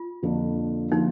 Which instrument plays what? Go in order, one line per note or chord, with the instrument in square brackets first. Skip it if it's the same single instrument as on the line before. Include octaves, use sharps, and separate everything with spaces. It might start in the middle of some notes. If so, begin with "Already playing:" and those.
Already playing: [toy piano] F4
[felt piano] F2 D3 F3 A#3 D4
[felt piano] D3 F3 A#3 D4 [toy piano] D#4